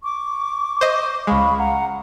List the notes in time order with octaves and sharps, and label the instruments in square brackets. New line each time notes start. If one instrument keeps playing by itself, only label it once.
[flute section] C#6 D6
[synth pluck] C5 D#5
[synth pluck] C#2 G#3 [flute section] F5 B5 C#6
[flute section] F5 F#5 A#5